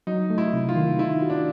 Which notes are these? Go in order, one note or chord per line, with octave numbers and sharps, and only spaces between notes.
F#3 D#4
A3
E4
C3
F4
D#3
D#4 E4
F#4
D4